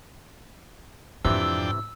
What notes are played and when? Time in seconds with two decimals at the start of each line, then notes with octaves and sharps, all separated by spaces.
1.25 F2 G#2 C3 E3 D4 G5 E6